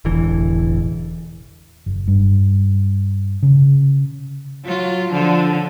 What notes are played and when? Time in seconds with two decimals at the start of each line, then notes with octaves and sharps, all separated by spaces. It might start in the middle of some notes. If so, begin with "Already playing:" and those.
0.05 E1 A1 D3 E3
1.86 F#1
2.08 G2
3.43 C#3
4.65 F#3 F4
5.10 D3 F3